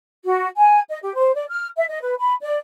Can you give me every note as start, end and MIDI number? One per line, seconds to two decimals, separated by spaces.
0.24 0.46 66
0.56 0.80 80
0.90 0.98 75
1.02 1.12 67
1.17 1.33 72
1.35 1.45 74
1.50 1.66 89
1.76 1.85 76
1.89 2.01 75
2.01 2.14 71
2.18 2.33 83
2.41 2.58 74